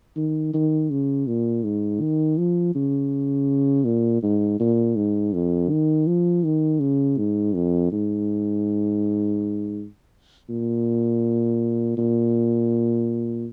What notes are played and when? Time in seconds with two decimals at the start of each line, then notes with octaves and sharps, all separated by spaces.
0.17 D#3
0.54 D#3
0.90 C#3
1.27 A#2
1.64 G#2
2.01 D#3
2.38 F3
2.75 C#3
3.85 A#2
4.23 G#2
4.60 A#2
4.96 G#2
5.33 F2
5.70 D#3
6.08 F3
6.44 D#3
6.80 C#3
7.18 G#2
7.55 F2
7.92 G#2
10.50 A#2
11.98 A#2